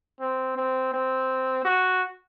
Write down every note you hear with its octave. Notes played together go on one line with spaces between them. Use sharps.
C4
C4
C4
F#4